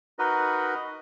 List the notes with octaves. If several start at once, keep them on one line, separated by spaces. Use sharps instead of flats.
D#4 F#4 A#4 B4 D#5